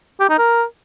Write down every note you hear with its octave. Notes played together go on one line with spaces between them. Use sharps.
G4
D#4
A#4